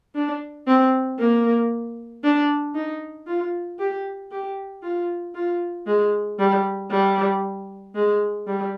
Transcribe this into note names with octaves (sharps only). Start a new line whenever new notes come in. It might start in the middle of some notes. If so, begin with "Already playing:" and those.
D4
C4
A#3
D4
D#4
F4
G4
G4
F4
F4
G#3
G3
G3
G#3
G3